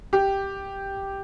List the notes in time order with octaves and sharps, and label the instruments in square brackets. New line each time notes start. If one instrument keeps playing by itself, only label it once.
[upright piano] G4